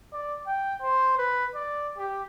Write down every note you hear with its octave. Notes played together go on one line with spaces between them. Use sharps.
D5
G5
C5
B4
D5
G4